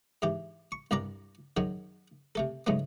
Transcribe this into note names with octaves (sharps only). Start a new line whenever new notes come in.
G#2 E3 G4
C#6
C2 G2 G3 D4 D5 A#5
F#2 D#3 F#3 G#4
C3 A3 A4
G#2 C#3 F#3 G#3 A3 B3